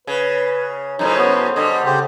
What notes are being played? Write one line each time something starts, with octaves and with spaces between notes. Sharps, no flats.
C#3 B4
F#2 A2 C#3 D#4 C5
B3
D3 G3 D#5
C#3 G4 C5